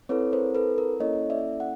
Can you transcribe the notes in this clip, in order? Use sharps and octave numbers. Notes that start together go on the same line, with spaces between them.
C4 E4 A4 B4 C#5
A#4 C5
A4 B4
A#4
A#3 C#4 E4 A4 C#5 D#5
D5 E5
F#5